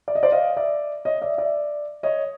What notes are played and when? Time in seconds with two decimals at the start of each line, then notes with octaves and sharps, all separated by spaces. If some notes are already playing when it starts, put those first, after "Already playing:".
0.08 D5
0.15 D#5
0.23 C5 D5
0.32 D#5 F5
0.57 D5 E5
1.05 C#5 D#5
1.22 D5 E5
1.38 D5 E5
2.03 C#5 D#5